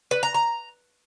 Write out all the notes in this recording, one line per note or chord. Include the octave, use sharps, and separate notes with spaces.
B4
A#5
A#5